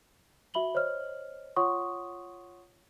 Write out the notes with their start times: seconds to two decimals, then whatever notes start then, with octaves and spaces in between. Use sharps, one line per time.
0.54 F#4 E5 B5 F#7 G7
0.75 C5 C#5 D#5 F6
1.56 F4 C#5 F#5 C6 C#6 D#6